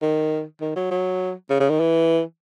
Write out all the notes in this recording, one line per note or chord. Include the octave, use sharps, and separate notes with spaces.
D#3
D#3
F#3
F#3
C#3
C#3
D#3
E3